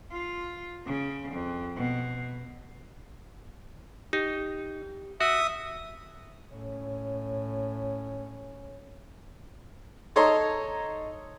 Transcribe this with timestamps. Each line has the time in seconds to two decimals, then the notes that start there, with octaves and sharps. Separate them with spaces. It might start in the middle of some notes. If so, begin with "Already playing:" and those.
0.11 F4
0.86 C#3
1.32 F2
1.76 B2
4.13 D#4 G4
5.21 F#4 E5 D#6
6.53 A2 C#4
10.16 D#4 A4 C#5 D#5 A#5 C6